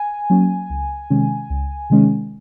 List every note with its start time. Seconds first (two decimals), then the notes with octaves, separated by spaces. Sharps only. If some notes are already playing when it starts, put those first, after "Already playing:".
Already playing: G#5
0.30 F#3 A#3 C#4
0.70 C#2
1.10 C3 D#3 G#3 C#4
1.50 C#2
1.90 C3 D#3 G#3 C#4